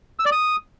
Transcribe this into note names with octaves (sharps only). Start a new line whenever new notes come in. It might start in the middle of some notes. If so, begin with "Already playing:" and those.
E6
D5
D#6